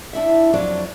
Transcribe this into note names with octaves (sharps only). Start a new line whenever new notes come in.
D4 E4 E5
F2 F#3 D4 D5